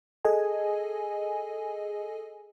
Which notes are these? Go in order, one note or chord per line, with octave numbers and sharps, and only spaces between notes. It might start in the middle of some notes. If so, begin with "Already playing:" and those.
G#4 A4 D#5 G#5